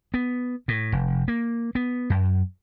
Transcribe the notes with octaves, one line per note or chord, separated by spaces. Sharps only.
B3
A2
F1
A#3
B3
F#2